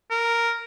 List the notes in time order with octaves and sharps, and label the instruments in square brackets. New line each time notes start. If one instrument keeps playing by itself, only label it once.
[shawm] A#4